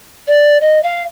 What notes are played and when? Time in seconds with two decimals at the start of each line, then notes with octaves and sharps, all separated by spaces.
0.27 D5
0.61 D#5
0.82 F5